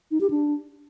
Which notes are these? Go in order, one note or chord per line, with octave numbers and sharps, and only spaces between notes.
D#4
G4
D4